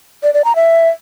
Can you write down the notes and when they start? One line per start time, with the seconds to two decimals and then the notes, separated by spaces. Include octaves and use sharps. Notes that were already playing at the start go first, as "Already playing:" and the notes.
0.23 D5
0.34 D5
0.45 A#5
0.56 E5